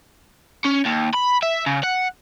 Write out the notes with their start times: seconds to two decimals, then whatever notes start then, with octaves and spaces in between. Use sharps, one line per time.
0.65 C#4
0.85 D#2
1.14 B5
1.43 E5
1.66 C#3
1.84 F#5